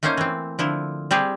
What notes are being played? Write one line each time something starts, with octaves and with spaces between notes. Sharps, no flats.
A3 A#3 C#4 D#4 C5
E3 C4
D3 F3 E4
G3 C4 G4 G#4